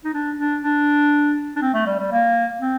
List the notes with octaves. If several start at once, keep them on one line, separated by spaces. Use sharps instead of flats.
D#4
D4
D4
D4
D4
C4
A3
G3
G3
A#3
C4